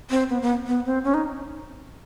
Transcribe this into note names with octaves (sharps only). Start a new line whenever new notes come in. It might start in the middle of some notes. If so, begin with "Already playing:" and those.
C4
B3
B3
B3
C4
C#4
D#4